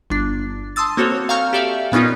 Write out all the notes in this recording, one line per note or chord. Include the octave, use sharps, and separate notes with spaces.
G1 D4
A5 C6 D#6 E6 A6
A#3 C4 F#4 A4 C#5
F5 G#5 A#5 C#6 F6 G6
G4 A4 D5 E5 F5
A#2 B3 C#4 D#4 F4